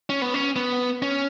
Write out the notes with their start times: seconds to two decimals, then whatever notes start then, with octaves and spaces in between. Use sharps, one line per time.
0.10 C#4
0.22 B3
0.34 C#4
0.56 B3
1.02 C#4